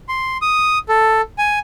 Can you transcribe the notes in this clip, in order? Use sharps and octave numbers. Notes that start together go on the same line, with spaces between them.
C6
D#6
A4
G#5